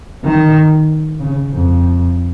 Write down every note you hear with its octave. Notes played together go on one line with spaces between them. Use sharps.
D#3
C#3
F2